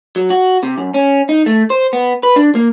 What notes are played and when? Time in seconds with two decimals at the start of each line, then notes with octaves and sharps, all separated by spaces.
0.16 F#3
0.30 F#4
0.63 C3
0.78 F#2
0.94 C#4
1.29 D#4
1.46 A3
1.70 C5
1.93 B3
2.23 B4
2.36 D4
2.55 A#3